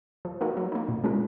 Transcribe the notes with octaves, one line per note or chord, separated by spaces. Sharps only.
F3
A#3 D#4 F#4 A#4
F#3
A#3 D#4
A#2
G#3 C#4 F4 A#4